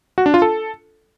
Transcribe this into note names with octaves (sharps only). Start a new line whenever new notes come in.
F#4
D4
F4
A4